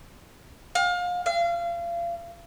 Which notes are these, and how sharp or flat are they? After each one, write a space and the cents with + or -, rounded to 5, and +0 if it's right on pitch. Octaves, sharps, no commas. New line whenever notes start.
F5 +30
F5 -30